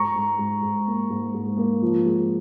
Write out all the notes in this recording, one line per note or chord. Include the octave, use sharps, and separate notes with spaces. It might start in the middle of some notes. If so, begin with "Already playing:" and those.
Already playing: G#2 A#5 C#6
G#2
G#2
G#2
A#3
G#2
G#2
A#3
F3
G#3